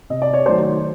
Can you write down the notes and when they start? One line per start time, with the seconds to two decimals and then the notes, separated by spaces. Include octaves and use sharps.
0.10 C3 D#5
0.22 D5
0.34 C#5
0.46 D#3 F#3 A3 C5 D5